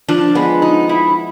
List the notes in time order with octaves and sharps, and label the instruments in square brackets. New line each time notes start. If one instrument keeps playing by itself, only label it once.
[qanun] F3 [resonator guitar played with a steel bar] D4
[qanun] G#3 [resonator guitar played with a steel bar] B3
[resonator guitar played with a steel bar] D#4
E4